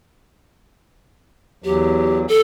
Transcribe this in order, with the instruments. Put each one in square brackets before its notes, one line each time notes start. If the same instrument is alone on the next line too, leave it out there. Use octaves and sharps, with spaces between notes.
[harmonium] E2 F#3 [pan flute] G4
[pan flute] A4